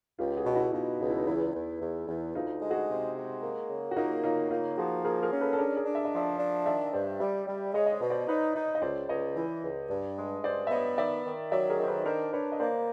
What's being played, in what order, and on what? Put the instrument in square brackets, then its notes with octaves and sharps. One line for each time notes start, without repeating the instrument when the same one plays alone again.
[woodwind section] C#2 [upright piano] F4 G4
[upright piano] F#4 G#4
[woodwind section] B2 [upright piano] G4
[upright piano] E4 F#4
[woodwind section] B2 [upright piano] D#4 F4
[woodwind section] C#2 [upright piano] F4
[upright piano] E4
D#4
[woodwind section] E2 [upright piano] E4
[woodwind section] E2
E2
E2
[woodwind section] D2 [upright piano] D#4 F4
[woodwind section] G#3
[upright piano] F#4 G#4
[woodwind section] C3
G#3
A#3
C#3
[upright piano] F#4
[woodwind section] A#3 [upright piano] D#4 F4
[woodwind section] C#3 [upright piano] D#4 F4
[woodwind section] A#3 [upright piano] D#4 F4
[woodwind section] F3 [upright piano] F#4 G#4
[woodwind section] A#3 [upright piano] G#4 A#4
[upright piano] G#4 A#4
[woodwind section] C#4
[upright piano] A4 B4
A4
[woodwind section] D4 [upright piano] G#4 A#4
[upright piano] G#4 A#4
[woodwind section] D4
[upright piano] E5
D#5
[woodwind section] F3 [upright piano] D5 E5
[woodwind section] D4
[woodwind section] D#3 [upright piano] D5 E5
[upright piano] D#5
[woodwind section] G2 [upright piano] C5 D5
[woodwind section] G3 [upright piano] D5 E5
[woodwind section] G3
[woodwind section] G#3 [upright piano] C#5 D#5
[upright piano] D#5
C5 D5
[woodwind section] B2
[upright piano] C5 D5
[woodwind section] D#4 [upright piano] B4 C#5
[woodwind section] D#4
[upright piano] D#5
[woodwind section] C#2 [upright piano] C5 D5
[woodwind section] C#2 [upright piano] C#5 D#5
[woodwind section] E3
C#2
G2
G#3
[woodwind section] G2 [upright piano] C5 D5
[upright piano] E5
[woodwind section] B3 [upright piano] C#5 D#5
[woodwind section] D#3 [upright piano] D5 E5
[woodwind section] D#3
[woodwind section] F#3 [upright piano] D5 E5
[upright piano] G#4 A#4
[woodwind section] D#3 [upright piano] C5
[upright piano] A4 B4
[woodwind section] D4 [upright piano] A#4 C5
[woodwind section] D4 [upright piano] B4 C#5
[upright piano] D#5
[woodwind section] A#3 [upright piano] C5 D5